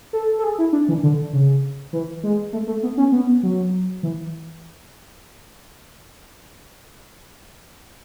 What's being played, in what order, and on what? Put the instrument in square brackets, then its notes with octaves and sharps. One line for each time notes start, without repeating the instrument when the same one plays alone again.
[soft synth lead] A4
A4
G#4
E4
D4
E3
D3
C#3
E3
G#3
A3
A3
B3
C#4
B3
F#3
E3